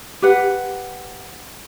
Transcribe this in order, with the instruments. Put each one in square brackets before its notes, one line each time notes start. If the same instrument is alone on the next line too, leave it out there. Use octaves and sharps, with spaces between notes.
[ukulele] G4 B4 F#5